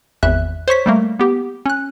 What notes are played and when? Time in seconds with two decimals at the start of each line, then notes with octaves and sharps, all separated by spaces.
0.23 G#1 E2 E5 F#6
0.68 C5 C#5 C#6 B6
0.86 G3 A3 A#3
1.19 B3 G4
1.66 C#4 F#6